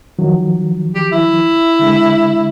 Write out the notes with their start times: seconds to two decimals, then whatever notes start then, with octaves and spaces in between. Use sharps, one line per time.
0.19 D#3 F3 F#3
0.95 G4
1.12 E4
1.79 D3 G#3